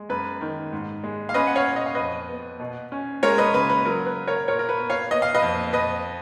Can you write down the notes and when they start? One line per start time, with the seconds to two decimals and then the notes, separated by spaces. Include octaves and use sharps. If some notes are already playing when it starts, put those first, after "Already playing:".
Already playing: G#3
0.09 F#2 B4
0.41 D#3
0.73 G#2
1.04 G#3
1.29 F5
1.34 C#4 B4 D#5
1.47 F#5
1.56 C#5 F5
1.67 A#2
1.76 D#5
1.86 F5
1.95 F2 B4 D#5
2.29 B3
2.60 B2
2.92 C#4
3.23 G#3 A#4 C#5
3.38 B4 D#5
3.54 C#3 B4
3.69 B4
3.85 F#3 A#4
4.06 B4
4.17 A#3
4.27 A#4 C#5
4.48 A#2 A#4 C#5
4.59 A#4
4.69 B4
4.79 B3
4.90 C#5 F5
5.11 B3 D#5
5.22 F5
5.35 B4 D#5
5.42 F2
5.73 F2 B4 D#5